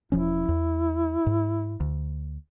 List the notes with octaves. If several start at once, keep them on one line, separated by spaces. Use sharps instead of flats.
E1 F3 C#4 E4
E2
G#2
D2